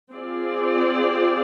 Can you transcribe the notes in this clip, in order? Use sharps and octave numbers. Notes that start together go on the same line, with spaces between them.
C4 F4 G#4 D5